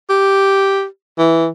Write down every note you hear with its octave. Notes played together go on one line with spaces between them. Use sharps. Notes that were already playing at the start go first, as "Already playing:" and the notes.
G4
E3